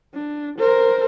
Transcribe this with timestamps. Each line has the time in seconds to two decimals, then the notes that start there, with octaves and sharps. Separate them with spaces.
0.14 D4
0.58 A#4 C5